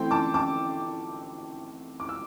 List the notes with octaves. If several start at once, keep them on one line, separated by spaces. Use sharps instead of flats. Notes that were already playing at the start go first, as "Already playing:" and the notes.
Already playing: E3 A3 C4 G5 C6
A5 D6
A5 D6
D6
E6